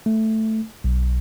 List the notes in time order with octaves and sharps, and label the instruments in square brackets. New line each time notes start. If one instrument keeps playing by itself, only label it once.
[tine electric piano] A3
B1